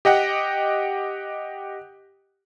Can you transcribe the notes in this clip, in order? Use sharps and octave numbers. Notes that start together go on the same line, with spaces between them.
G4 D#5 F#5 G5